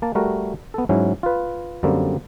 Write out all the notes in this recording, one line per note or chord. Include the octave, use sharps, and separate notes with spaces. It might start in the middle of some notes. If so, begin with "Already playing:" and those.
A#3 A5
G3 A3 F#4 A#4
B3 A4
G#2 F#3 C#4 E4
F4 B4
F#2 D3 G3 A#3 C4